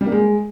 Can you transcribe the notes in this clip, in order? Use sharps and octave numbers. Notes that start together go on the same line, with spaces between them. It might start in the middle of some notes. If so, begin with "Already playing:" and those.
G3
A#3
G#3